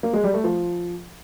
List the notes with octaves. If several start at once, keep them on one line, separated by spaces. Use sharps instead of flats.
A#3
G#3
G3
A3
F3